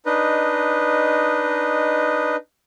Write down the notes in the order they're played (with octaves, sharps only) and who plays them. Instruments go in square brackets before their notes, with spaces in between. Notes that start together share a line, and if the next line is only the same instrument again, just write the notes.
[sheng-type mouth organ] D4 D#4 B4 D#5